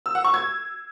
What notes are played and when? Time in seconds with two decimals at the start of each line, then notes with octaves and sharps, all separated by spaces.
0.06 E6
0.15 F#5
0.24 C#6
0.34 G#6